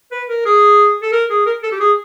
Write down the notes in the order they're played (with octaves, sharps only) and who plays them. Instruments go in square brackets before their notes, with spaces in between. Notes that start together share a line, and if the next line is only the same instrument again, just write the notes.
[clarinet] B4
A#4
G#4
A4
A#4
G#4
A#4
A4
G4
G#4